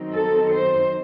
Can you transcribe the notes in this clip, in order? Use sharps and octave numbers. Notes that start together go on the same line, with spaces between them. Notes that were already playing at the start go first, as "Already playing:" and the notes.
Already playing: D#3 F#3 C4 D#4
A4
C5